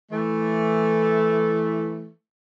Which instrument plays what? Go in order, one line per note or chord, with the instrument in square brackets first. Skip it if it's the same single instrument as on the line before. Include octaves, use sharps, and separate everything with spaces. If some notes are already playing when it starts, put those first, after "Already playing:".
[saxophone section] E3 A3